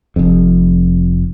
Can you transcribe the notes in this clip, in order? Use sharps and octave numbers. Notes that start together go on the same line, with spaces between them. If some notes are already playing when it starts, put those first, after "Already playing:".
F1 F2